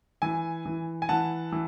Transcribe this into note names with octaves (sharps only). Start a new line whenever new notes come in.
E3 G#5
E3
G#5
E3 F#5 A5
E3